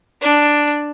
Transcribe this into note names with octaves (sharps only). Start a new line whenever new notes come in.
D4